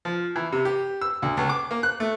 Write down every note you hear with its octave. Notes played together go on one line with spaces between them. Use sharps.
F3
E3
C3
G4
E6
D2
C#2
D6
A#3
F#6
A3